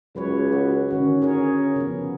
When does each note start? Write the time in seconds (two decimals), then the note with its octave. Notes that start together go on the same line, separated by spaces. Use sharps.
0.16 C#2 F#3 B4 C#5
0.52 F#4
0.91 D3 D#3 C#4 F#4
1.22 G#4 A#4 C#5
1.76 C#3 F3 B3